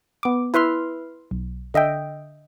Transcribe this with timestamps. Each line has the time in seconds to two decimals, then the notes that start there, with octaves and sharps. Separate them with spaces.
0.23 B3 D6
0.54 E4 B4 E5 C6 F6
1.31 B1
1.74 D3 D#5 E5 G5